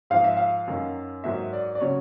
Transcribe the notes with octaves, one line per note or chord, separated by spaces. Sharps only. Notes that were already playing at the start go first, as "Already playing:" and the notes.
G#2 F3 F5
E5
F5
F#2 D#3 F#3
G#2 D#3 F#3 E5
D5
D5
C#3 F#3 C#5